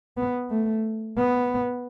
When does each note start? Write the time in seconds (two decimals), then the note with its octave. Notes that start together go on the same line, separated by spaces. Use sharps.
0.17 B3
0.51 A3
1.18 B3